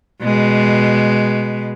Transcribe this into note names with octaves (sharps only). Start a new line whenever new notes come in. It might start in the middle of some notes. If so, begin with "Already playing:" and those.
B2 G#3